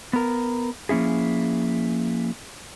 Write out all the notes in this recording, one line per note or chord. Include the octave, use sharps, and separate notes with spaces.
B3 A#4
F3 A#3 C#4 E4 G#4